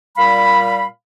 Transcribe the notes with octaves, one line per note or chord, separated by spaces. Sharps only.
A#2 G3 F5 B5